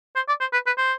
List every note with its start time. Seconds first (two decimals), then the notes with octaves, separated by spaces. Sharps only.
0.16 C5
0.28 D5
0.40 C5
0.53 B4
0.66 B4
0.78 C5